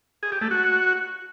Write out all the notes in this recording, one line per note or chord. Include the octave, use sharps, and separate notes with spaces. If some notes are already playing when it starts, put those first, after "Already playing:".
G#4
G4
A3
F#4